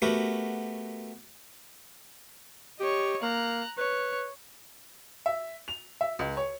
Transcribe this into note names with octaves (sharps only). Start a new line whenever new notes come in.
A3 B3 F#4 G4 A#4
G4 C#5 D#5
A#3 A#5 F#6
B4 C#5
E5
F7
E5
C#2
C#5